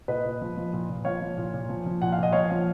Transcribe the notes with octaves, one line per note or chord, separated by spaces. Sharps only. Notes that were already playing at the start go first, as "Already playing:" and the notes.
A#2 B4 D#5
A#2
F3
F3
A#2
A#2
F3 C#5 F5
F3
A#2
A#2
F3
F3
A#2 F#5
F5
A#2 D#5
F3 C#5 F5
F3